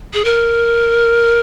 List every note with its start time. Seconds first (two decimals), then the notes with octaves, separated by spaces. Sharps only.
0.14 G#4
0.25 A#4